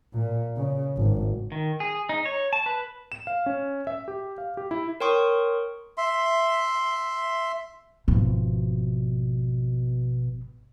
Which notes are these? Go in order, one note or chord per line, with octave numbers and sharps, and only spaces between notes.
A#2
C#3
G#1
D#3
G#4
D#4
C#5
A5
B4
E7
F5
C#4
E5
G4
F5
G4
E4
A#4 C#5 G5 C6 C#6 D#6
E5 C6
G#1 B2 F3